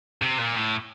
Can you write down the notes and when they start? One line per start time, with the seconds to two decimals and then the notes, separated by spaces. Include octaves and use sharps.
0.22 C3
0.39 A#2
0.57 A2